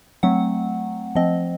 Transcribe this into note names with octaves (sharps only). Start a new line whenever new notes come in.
F#3 A3 C4 F#5
F3 C4 D#5